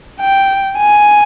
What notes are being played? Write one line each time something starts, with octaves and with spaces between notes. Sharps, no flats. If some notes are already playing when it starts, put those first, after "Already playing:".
G5
G#5